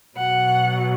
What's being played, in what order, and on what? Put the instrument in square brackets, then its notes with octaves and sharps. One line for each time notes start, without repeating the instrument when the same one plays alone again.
[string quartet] B2 F#3 F#5